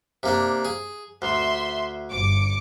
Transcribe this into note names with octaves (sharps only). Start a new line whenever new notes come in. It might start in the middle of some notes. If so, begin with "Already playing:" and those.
C3 A#3 D4
G#4
D2 E5 C6
G1 D6 C#7